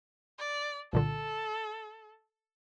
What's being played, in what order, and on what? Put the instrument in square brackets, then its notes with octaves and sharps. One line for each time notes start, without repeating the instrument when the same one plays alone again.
[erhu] D5
[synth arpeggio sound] C2 A#2 D3 [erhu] A4